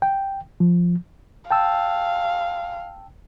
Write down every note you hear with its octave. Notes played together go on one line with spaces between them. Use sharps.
G5
F3
F5 G5 A5 E6